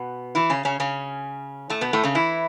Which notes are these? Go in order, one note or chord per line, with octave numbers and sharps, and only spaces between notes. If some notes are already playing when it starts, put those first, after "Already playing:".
Already playing: B2 B3
E3 E4
C#3 C#4
C#3 C#4
C#3 C#4
A2 A3
B2 B3
A2 A3
C#3 C#4
E3 E4